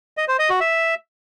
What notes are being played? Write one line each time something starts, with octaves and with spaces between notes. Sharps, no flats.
D#5
C5
D#5
F#4
E5